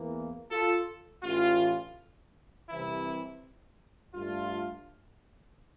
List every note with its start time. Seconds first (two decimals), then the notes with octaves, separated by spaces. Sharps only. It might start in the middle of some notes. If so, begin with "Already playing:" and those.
Already playing: E2 E3 A#3
0.51 F4 A4
1.24 A1 A2 E3 F4
2.70 C2 C3 E3 E4
4.15 G2 D3 A3 D4 F4